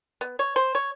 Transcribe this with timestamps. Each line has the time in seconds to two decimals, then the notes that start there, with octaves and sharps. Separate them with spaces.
0.21 B3
0.39 C#5
0.56 C5
0.75 C#5